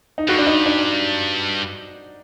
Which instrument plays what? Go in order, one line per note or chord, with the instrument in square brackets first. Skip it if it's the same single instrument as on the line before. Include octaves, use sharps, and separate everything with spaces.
[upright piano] D#4
[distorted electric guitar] G2 [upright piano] F#4
[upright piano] D4
D#4
D4